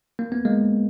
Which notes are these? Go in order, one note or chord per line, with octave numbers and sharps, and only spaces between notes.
A#3
B3
G#3 A#3